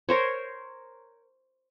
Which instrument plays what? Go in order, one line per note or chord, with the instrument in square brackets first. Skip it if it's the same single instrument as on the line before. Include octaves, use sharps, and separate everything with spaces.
[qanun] A#4 C5 C#5